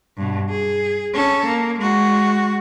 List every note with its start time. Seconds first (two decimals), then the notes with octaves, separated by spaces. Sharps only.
0.17 G2 B2
0.49 G#4
1.14 C#4 A4
1.46 A#3
1.79 G#3 F#4